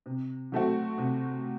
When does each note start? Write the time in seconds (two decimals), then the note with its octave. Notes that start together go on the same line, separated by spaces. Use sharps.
0.06 C3
0.52 F#3 A3 C4 F#4
0.98 C3